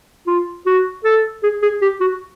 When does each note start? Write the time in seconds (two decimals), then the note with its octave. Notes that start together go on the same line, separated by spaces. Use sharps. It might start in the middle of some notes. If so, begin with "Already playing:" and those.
0.27 F4
0.66 F#4
1.04 A4
1.43 G#4
1.62 G#4
1.82 G4
2.00 F#4